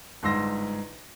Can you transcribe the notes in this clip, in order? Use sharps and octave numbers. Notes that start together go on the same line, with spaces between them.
G1 G#2 C6 E6 A#6